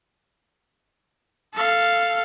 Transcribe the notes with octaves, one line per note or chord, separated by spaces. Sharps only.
A4 F5